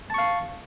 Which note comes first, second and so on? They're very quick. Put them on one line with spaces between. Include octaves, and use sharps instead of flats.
A5 C#6 F5